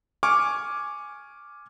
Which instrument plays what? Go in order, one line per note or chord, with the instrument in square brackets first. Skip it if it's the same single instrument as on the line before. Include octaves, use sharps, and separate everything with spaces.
[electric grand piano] G#5 C#6 D6 F6